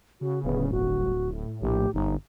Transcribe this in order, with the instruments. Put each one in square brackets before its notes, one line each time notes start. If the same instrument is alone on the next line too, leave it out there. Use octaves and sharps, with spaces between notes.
[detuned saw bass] C#3 [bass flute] F#4
[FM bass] D1 [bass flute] B3
[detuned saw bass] G1 [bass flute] F#4
[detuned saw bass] A2
[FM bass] A#1 [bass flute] G4
[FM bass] G1 [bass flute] D#4